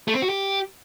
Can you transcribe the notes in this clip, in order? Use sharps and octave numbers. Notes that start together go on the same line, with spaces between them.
A3
C4
F#4
G4